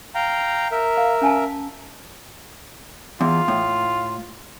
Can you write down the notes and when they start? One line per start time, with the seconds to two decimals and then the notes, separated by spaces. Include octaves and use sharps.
0.15 F5 G5 A#5
0.71 A#4 E5
0.97 F5
1.21 C#4 G#5 A5
3.21 E2 F4
3.48 A2